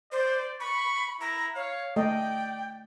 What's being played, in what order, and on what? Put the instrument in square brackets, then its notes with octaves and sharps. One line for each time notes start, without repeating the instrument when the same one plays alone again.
[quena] C5 [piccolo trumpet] D5
[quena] B5 [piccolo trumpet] C#6
[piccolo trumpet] E4 [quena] A#5
[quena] C#5 [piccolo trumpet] F5
[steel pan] A3 D#5 [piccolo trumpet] D5 [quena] G5